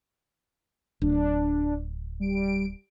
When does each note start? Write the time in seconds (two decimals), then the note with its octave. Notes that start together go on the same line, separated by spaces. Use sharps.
1.02 D1 D4
2.20 G3 D7